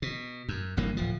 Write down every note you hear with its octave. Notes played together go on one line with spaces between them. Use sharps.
B2
F#2
G1 G2 E3 A#3
D1 F3